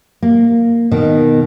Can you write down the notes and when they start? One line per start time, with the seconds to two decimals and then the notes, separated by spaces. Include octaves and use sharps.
0.22 A#3
0.91 B2 D#3